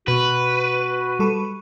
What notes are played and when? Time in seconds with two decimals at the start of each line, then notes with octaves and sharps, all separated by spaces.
0.08 B2 F#4 B4
1.19 G3 A4 C#6